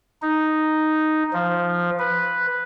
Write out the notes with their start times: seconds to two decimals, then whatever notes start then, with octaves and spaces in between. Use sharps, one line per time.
0.22 D#4
1.33 F3
1.99 B4